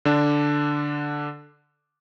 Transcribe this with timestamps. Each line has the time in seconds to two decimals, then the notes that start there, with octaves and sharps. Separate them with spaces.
0.05 D3 D4 A5